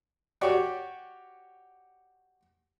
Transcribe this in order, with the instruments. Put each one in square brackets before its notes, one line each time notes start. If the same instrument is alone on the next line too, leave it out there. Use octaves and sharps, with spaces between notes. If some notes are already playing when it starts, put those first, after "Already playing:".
[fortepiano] F#4 G4 C#5 D5